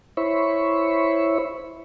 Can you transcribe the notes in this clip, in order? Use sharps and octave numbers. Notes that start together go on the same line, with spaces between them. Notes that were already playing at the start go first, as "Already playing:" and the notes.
E4 C5 C#5 E5 B5 C#6